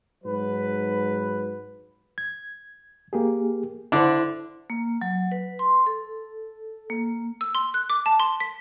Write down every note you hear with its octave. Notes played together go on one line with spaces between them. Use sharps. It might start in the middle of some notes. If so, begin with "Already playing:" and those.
G#2 F#3 B4
G#6
A#3 G4 G#4
D3 D4 E4 C5
A#3
F#3
B4
C6
A4
A#3
E6
C6
F#6
D6
A5
C6
B6